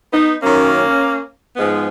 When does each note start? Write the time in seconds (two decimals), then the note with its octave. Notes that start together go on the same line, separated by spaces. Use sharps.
0.13 B3 D#4
0.41 F#2 D#3 A#3 C#4
1.56 G#2 F3 G#3 B3